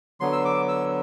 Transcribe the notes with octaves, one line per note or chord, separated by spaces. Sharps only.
D3 F#3 B3 C6
E6
D6
E6